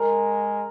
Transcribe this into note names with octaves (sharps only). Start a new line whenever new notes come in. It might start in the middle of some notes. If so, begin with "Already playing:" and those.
Already playing: G#3 A#4